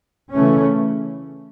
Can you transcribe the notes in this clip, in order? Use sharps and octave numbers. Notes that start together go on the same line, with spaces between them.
C#3 E3 A3 C#4